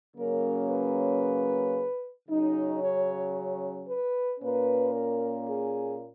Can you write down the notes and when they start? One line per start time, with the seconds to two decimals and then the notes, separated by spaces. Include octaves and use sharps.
0.16 C#3 F#3 A#3 C#4 A#4
0.69 B4
2.28 C#3 F#3 C#4 D#4
2.82 C#5
3.87 B4
4.40 A#2 A#3 C#4 B4
4.93 A#4
5.46 G#4